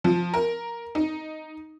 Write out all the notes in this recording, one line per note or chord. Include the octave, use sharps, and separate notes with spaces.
F3
A#4
D#4